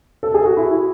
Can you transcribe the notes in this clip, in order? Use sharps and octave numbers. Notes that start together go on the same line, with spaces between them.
A4
G#4
F#4
E4